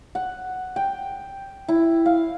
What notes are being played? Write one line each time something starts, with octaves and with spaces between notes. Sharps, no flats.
F#5
G5
E4
F5